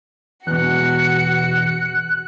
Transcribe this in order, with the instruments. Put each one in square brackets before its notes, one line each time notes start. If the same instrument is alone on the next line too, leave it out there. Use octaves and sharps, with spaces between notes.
[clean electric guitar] E2 B2 [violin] F#4 C#7 [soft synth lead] F#6